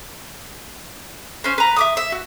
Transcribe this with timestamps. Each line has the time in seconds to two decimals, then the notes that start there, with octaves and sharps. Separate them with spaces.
1.44 C#4 C5
1.58 B4 A#5
1.76 E5 D6 D#6
1.97 E5
2.12 F#4